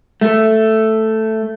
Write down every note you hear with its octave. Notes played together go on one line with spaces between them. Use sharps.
A3